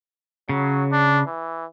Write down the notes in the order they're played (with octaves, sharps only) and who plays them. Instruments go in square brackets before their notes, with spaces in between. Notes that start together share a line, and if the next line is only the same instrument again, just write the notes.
[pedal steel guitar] C#3 [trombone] F#3
[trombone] D4
E3